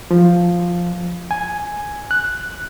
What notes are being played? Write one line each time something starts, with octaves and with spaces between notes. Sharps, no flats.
F3
G#5
F#6